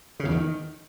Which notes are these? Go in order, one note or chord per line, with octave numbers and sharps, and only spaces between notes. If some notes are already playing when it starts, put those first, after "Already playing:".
C#3
E2
D#3